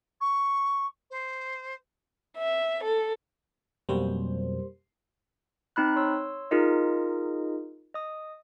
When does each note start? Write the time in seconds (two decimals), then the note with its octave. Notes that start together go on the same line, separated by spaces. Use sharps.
0.20 C#6
1.10 C5
2.37 E5
2.82 A4
3.89 F2 B2 F#3 G3 A#3 C5
5.76 C4 D#4 B5 F#6
5.96 C#5 C6 E6
6.51 D#4 F4 G#4 A#4 D#5
7.94 D#5 D#6